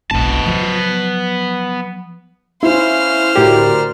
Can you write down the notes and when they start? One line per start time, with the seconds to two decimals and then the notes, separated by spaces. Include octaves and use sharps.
0.11 F1 B1 B3 A5
0.46 F3 F#3
2.63 C#4 E4 C5 F5 F6
3.36 D2 A2 F#4 G4 A#4 D5